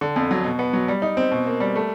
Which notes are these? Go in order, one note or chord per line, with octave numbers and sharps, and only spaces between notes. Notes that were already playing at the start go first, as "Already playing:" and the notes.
D3
F2
F#3
B2
B3
F#3
G3
D#4
C4
B2
A#3
G3
A3